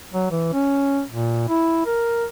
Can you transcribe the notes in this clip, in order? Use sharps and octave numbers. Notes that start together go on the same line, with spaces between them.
F#3
E3
C#4
A#2
E4
A#4